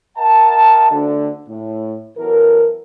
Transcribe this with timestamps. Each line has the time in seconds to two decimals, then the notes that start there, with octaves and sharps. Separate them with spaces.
0.17 A#4 D#5 F5 G5 A5
0.91 D2 D3
1.48 A2
2.18 E3 F#3 B3 A4 A#4